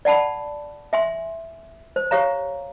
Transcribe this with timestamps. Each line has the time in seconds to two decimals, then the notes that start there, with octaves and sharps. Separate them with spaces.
0.05 D5 F#5 A5 B5
0.93 E5 G#5 C6
1.96 C5
2.11 G4 C#5 F5 A#5